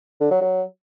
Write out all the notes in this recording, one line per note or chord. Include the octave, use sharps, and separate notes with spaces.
D3
F#3
F#3